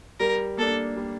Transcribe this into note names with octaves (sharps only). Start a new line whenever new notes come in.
G3 A#4
A#3 D4 A4
G3